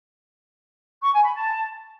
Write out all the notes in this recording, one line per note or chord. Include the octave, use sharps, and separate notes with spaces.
C#6
G#5
B5
A5